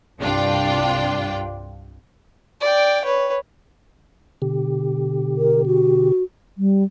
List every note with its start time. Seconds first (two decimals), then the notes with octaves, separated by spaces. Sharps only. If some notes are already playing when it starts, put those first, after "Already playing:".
0.19 C2 G2 D4 F4 G5
2.61 D5 G5
3.05 B4 C#5
4.42 B2 D3 G4
5.37 A#4
5.66 F#4
6.58 G3